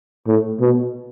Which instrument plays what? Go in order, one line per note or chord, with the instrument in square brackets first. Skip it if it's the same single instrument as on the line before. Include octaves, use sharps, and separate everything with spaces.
[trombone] A2
B2